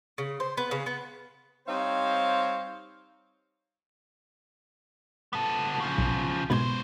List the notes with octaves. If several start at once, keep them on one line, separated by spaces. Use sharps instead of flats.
C#3
C5
B3
C#3
B3
G3 C4 D#4 C5 C#5 F5
B3 A4
C#3 F3
B1
G#2 B2 B3 C5 G#6